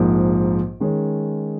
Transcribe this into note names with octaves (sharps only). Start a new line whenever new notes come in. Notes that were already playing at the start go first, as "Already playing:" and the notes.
Already playing: A#1 G#2 F3 A#3
D#3 G#3 C#4